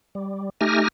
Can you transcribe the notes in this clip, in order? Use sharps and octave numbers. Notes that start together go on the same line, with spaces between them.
G3
A3 D#4 G4 G#5 F6 A#6